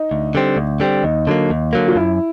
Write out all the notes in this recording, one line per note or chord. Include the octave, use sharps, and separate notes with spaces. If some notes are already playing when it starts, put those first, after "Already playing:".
Already playing: D#4
D2
D3 G3 C4
D2
D3 G3 C4
D#2 D#4
D3 F#3 A#3
D#2
D3 F#3 A#3
F4
F#2 E4